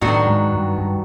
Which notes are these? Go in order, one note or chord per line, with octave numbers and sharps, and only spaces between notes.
A2 D#3 F#3 B3 D4 F#4
G#2
G2
G2